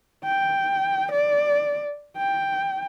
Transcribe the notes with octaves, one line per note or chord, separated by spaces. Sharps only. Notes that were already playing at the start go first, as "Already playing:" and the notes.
G5
D5
G5